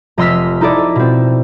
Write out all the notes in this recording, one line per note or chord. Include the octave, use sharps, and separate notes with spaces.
F1 D#5 C6 E6 F6 B6
D#4 E4 A4 D5 D#5
B2 C4